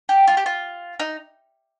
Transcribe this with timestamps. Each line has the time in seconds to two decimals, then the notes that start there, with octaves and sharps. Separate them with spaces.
0.09 G4
0.27 F4
0.37 G4
0.46 F4
1.00 D#4